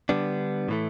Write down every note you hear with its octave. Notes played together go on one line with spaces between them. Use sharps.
D3 G3 B3 D4
A2 E3 A3